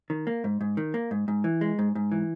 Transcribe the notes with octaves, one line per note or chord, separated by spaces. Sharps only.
D#3
A#3
G#2
G#2
D#3
A#3
G#2
G#2
E3
G#3
G#2
G#2
E3